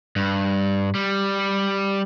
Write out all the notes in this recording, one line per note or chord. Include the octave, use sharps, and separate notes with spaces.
G2
G3